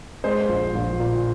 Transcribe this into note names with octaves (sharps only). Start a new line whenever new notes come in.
G#3 C5
A#1
A#1
A#2